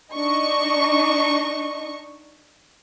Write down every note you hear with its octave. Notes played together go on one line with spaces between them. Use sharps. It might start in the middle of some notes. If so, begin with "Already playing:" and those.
D4 D#4 D#5 C#6